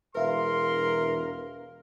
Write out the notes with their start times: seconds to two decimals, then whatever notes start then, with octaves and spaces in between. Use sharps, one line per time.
0.15 E1 A#4 B4 E5 F5 C6